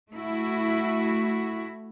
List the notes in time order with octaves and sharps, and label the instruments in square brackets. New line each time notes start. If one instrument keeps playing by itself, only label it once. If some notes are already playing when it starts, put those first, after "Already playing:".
[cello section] A3 E4 F#4